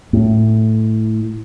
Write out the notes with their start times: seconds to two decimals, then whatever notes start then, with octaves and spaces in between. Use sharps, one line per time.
0.13 A2